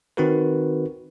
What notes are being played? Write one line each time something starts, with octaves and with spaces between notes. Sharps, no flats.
D#3 C4 D#4 F#4 A#4 B4